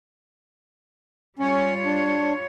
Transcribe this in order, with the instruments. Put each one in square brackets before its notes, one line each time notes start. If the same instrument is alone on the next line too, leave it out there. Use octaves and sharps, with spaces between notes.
[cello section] G3 F4 C#5 [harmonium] C#4
[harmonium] D4